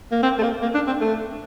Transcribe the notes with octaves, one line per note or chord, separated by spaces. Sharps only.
A#3
C4
A3
A#3
A#3
D4
C4
A3